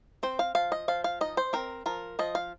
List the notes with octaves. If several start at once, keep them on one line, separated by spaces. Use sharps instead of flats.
C4 C5
F5
F3 F5
D#5
F3 F5
F5
D#4 D#5
C5
C4 A#4
F3 A#4
F3 D#5
F5